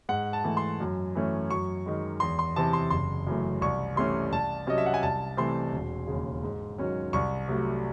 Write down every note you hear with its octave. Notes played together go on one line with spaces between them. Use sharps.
G#2 F#5
A5
E3 A3
C6
F#2
E3 A3 C#4
F#2 C#6
D#3 G#3
E2 C6
C6
C3 E3 C4 A5
C6
F#1 C6
F#2 E3 A3
C2 C#6
C3 E3 A3 C#4 C6
C2 A5
C3 F#3 C#4 D#5
E5
F#5
G#5
C2 A5
C3 E3 A3 C4 C6
E1
D#2 C#3
G#2
D#3 F#3 C#4
C2 C#6
C3 F#3 A3